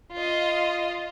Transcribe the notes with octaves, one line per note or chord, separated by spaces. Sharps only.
F4 D#5